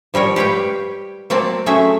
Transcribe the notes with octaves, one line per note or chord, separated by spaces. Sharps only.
F3 G3 A#4 C#5
G4 B4 C#5 F5 G5
F#3 A#3 C4 D5 A5
F#3 A3 C#4 G#4 E5